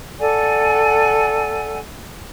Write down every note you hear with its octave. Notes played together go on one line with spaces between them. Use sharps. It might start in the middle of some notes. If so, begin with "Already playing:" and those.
A4 D5 F#5 G#5